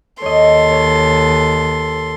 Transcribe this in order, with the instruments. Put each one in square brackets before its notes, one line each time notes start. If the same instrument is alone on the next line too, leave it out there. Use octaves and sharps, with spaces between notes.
[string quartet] D#2 A4 C6 [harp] C#5 D#5
[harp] C#5